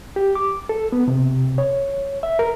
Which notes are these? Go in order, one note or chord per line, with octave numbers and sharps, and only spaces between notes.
G4
D6
A4
B3
C3
C#5
E5
A#4